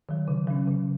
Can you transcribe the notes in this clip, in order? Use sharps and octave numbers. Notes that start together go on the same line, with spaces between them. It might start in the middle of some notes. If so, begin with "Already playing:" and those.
D#3 F#3
C#3
F#3 C#4
C#3